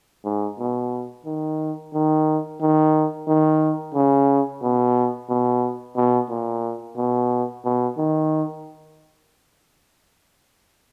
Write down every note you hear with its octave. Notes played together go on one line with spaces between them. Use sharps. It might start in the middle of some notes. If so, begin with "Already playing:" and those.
G#2
B2
D#3
D#3
D#3
D#3
C#3
B2
B2
B2
A#2
B2
B2
D#3